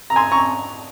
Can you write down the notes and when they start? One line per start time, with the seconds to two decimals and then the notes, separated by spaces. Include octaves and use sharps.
0.10 A#5
0.16 G#5 C6
0.31 A#5 C#6